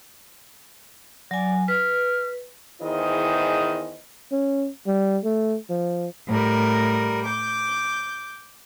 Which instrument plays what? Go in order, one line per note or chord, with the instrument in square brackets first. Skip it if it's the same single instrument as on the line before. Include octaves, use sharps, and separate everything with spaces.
[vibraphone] F#3 G#5 [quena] D5
[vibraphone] B4 [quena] F6
[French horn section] E2 D#3 E4 G#4 C5 D#5
[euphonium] C#4
G3
A3
F3
[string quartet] A2 G3 A#4
D6 G6